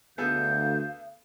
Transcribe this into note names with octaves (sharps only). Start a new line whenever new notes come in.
D2 B3 G#4 A4 F5 G6